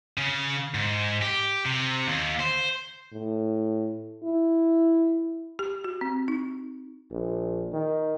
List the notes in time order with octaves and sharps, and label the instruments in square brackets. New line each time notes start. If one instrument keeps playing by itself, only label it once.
[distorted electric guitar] C#3
G#2
G4
C3
D#2
C5
[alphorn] A2
E4
[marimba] G4
F#4
C4
D#4
[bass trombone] A#1
D#3